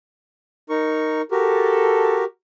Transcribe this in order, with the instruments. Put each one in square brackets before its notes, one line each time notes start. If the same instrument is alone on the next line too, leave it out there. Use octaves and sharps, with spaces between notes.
[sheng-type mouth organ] D#4 A#4 C#6
[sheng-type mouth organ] F#4 G4 A#4 [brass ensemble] A4